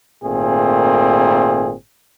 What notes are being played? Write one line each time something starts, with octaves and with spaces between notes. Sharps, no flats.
G#1 A#2 A3 C4 G#4